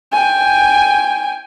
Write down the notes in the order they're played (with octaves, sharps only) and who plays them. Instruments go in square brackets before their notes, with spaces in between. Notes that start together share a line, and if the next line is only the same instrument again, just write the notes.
[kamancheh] G5 G#5